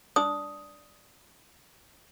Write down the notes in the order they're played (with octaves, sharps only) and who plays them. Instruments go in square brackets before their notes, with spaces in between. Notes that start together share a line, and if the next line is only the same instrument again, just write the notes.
[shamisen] D4 [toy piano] D#6